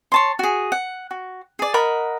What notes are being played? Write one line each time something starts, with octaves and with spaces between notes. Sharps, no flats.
C#5 A5 C6
F#4 G#4
F#5
F#4
G#4 D5
A#4 D#5 F#5 B5